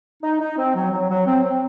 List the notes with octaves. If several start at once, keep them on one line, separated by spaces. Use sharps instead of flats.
D#4
D#4
C4
F#3
F#3
F#3
C4
C4